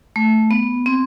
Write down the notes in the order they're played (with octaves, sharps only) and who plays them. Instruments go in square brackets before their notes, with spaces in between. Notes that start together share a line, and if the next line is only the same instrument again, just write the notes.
[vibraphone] A3
B3
C4